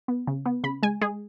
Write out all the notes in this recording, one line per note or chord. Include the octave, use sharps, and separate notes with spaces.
B3
C#3
B3
C#3 B5
G#3 G#5
G#3 G#4